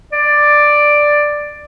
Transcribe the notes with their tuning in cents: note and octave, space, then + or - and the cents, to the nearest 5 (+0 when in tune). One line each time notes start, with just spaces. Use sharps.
D5 +5